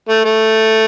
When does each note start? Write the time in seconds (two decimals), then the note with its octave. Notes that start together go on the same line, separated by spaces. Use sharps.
0.09 A3
0.25 A3